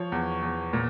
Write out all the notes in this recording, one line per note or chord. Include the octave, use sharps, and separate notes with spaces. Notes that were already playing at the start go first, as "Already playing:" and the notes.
Already playing: F3 C#5
E2
E2
A#2